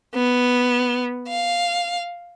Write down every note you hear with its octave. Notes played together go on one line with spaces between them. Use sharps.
B3
F5